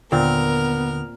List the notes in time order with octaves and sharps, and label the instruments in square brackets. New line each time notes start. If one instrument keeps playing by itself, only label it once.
[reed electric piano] D#2 D3 [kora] A#2 C4 [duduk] B3 [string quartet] A#4 F6